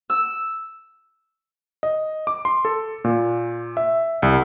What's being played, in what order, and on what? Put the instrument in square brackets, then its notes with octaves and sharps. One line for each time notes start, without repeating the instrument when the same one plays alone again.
[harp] E6
[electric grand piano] D#5
D6
C6
A4
A#2
E5
C2